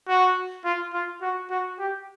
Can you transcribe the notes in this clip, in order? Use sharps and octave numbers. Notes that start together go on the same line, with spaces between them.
F#4
F4
F4
F#4
F#4
G4